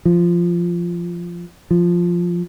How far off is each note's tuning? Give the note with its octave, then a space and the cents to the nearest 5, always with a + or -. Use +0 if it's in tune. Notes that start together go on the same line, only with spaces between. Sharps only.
F3 -10
F3 +0